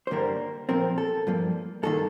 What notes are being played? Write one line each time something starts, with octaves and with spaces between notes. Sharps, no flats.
C5
G2 D3 G3 A#3 A#4
A#2 F3 C4 A#4
A4
G2 F3 A#3
G2 D#3 A#3 A4